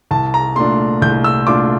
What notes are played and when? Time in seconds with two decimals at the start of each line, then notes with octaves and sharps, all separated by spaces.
0.11 C2 A5
0.34 A#5
0.56 A#2 A3 D4 F4 C6
1.02 C2 G6
1.24 E6
1.47 A#2 A3 D4 F4 D6